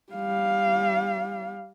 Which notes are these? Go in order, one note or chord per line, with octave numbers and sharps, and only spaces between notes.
G3 F5